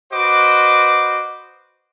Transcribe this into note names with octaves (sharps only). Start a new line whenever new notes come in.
F#4 B4 C5 D#5 D6